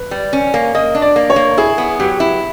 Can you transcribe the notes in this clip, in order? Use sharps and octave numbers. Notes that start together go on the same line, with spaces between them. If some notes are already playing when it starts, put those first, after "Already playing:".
Already playing: B4
G3
C#4
A#3
A#3 D#5
D4
D5
A#3
C#5
A#3
E4 G#4
B3
F#3 G4
E4